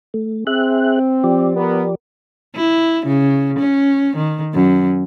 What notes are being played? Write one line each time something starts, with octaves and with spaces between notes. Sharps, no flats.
A3
C4 G#4 E5 F#6
F3 G4 D5
B3 A#4
E4
C#3
C#4
D#3
F#2